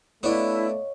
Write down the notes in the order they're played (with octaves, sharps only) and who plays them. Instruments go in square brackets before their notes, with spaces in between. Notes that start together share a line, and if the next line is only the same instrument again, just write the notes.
[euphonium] A3 [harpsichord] B3 D4 [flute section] E4 [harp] C#5 D#5 F5